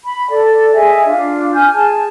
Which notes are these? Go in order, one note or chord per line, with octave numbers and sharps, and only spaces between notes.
B5
A4 D5
G#4 D#5 E5 G#5
D4 F4
G#5 F6 G6
G#4 G#5 A5